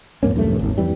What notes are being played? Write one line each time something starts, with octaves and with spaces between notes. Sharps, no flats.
F2 G#2 A#3 C#4
B1 E2 G2 A3
G#1 D#2
F2 E3 G3